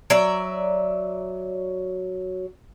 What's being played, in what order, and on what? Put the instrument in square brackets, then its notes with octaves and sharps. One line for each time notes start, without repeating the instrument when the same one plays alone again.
[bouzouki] F#3 D5 E5